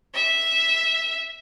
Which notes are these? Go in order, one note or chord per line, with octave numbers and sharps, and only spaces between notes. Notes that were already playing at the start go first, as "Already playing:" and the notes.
E5